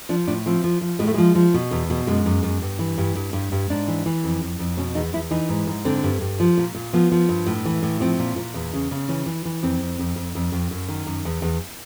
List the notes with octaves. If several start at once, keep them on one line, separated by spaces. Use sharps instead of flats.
F3 D4
A2 D4
F3 C4
F3
F3
A2 G#3
A3
F3 G#3
F3
B2
E2
B2
F#2 G#3
F#2
F#2
G2
E3
G2
G2
G2
G2
G#2 D4
E3
E3
F2
F2
F2
B2 C#4
E2 D#4
E2 E4
E3 D#4
G#2
G#2
D3 C4
G2
G2
F3
A#2
A#2
F3 B3
F3
G2
A2
E3
A2
F3 C4
A#2
A#2
E2
C#3
C#3
E3 C#4
E3
E3
F2 C4
F2
F2
F2
F2
F2
F#2
D#3
F#2
E2
E2